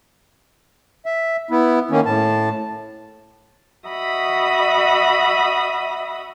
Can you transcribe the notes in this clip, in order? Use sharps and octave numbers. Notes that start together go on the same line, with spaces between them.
E5
B3 E4
D#3 A#3 C#4
A2 A5
F#4 D#5 E5 B5 D#6